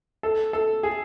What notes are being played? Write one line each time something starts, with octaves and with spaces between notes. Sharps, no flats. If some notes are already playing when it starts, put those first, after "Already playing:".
A4
A4
G#4